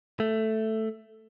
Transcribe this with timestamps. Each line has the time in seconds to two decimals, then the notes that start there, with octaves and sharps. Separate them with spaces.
0.20 A3